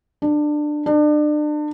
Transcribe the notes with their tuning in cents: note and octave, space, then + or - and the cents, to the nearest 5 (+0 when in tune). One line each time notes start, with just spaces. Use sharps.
D4 +20
D4 +35